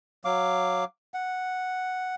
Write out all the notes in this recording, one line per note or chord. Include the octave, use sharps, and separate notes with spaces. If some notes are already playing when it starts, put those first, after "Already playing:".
F#3 F5 D6
F#5